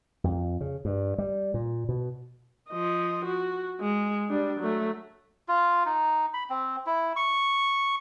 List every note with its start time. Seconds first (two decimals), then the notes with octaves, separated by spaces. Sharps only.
0.24 F2
0.61 C#3
0.85 G2
1.18 G3
1.54 A#2
1.89 B2
2.71 F3 D#5
3.26 F#4
3.81 G#3
4.29 G3 D4
4.60 F#3 A3
5.48 F4
5.86 D#4
6.34 B5
6.50 C4
6.86 E4
7.16 C#6